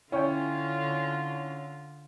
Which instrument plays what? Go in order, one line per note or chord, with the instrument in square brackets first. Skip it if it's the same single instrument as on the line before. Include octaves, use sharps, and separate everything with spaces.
[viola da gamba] D3 F4 [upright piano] C#4 [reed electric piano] E4 C#5 G5